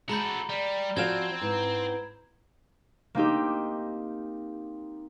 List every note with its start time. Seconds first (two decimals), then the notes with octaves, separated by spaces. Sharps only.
0.09 G#3 F#4 A4 A#5 B5 G6
0.49 G3 D5
0.97 F3 C4 F#4 F5 G#6 E7
1.41 G#2 E4 B4 A#5
3.15 A#3 C4 D#4 G4